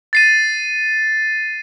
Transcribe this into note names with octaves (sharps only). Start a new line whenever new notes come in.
A6 C7 D#7